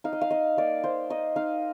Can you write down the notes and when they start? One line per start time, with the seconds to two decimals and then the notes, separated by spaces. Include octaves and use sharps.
0.04 D#4 F5
0.13 D#5
0.21 F5
0.31 D#4 D#5
0.57 A#3 D5
0.84 A#3 C5
1.10 D#4 D#5
1.36 D#4 F5